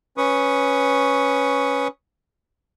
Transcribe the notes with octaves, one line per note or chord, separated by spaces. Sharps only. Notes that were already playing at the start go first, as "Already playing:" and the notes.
C#4 B4 C#6 D#6